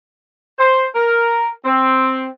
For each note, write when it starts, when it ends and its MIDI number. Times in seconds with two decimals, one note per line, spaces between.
0.59 0.86 72
0.95 1.50 70
1.65 2.27 60